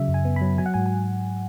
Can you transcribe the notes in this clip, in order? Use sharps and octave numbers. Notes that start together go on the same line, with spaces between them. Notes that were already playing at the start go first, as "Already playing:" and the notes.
Already playing: C#3 F#3 E5
F#2
G#5
B3
F#3 B5
F#3 G#5
F#5
G#2 G#5
G#5